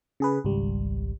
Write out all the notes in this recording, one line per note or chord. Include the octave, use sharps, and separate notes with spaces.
C#3 G#4 B4
G#1 C#2 G3